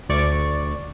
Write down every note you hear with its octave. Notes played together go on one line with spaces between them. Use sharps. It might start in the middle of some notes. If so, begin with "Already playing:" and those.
D2 D5 C#6